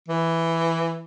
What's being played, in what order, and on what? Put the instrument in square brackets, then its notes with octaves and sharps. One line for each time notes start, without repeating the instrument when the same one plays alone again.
[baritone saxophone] E3